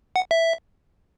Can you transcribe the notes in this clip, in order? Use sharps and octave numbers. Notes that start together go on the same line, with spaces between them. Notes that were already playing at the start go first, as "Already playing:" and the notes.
F#5
E5